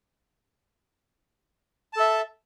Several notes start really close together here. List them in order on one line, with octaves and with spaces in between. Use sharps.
A5 A4 E5